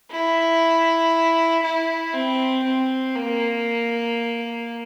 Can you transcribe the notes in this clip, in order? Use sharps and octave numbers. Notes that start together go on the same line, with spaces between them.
E4
E4
C4
C4
A#3